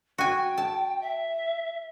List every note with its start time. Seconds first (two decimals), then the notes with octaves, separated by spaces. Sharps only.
0.18 F#4 G5 G#5
0.58 A5
1.00 E5